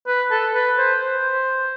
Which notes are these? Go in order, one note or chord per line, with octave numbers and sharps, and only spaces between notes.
B4
A4
B4
C5
C5